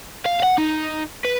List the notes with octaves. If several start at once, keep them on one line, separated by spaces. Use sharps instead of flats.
F5
F5 F#5
D#4
B4